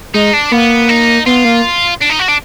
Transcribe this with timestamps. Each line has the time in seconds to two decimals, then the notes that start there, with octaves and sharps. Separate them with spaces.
0.14 G#3 D#4
0.33 D4
0.51 A#3 B3
0.89 D#4
1.26 B3 F4
1.45 A#3
2.01 D4
2.09 D#4
2.19 F#4
2.28 D4